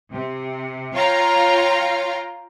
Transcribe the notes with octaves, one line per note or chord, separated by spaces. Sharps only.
C3
F4 C#5 F5 G5 A#5